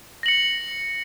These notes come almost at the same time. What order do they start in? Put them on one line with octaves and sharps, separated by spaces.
A#6 F#7 C#7